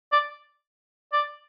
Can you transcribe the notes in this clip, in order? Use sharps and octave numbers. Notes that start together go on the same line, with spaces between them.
D5
D5